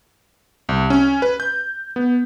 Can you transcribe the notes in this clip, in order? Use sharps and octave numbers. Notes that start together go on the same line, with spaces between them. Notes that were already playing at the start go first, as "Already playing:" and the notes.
C2
C#4
B4
G6
B3